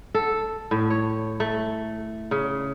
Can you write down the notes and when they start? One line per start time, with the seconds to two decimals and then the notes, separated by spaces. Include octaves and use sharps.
0.14 A4
0.71 A2
0.90 C#5
1.40 A3
2.31 C#3